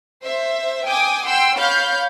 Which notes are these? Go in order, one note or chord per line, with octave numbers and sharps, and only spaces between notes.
C5 E5
G5 G#5 D6 D#6
F#5 G5 C6 E6
C#5 F5 B5 G6